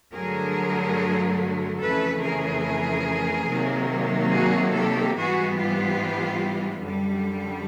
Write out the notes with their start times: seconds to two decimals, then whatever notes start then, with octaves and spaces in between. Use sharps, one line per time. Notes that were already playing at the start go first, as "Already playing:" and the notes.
0.14 G2 D3 F#3 A3 G#4 A#4
1.81 F2 C#3 E3 A3 A4 B4
2.24 G#4 A#4
3.50 C3 D#3 F#3 A#3
4.33 F#4 G#4
4.75 G4 A4
5.17 G#2 E3 G3 B3 F#4 G#4
5.59 F4 G4
6.85 F#2 D3 G3